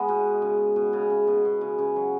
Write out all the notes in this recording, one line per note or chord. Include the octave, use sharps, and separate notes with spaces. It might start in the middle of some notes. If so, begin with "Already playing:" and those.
Already playing: G#3 B3
B2
C#3
B2
C#3
C#3
B2
B2
C#3
C#3
F#3